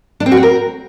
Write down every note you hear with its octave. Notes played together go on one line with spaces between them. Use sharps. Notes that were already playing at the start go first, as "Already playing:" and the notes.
D4
C4
F#4
C4
A#4